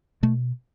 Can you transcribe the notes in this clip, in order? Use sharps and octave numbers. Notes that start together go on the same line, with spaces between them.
B2 A3